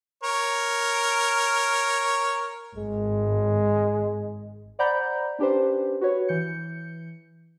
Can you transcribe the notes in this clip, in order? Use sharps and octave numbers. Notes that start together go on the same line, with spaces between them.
A#4 C#5
G#1 G#3
C5 D5 F#5 A#5 B5 G6
C#4 D4 G4 B4 C5
F#4 B4 C#5
E3 G6 C#7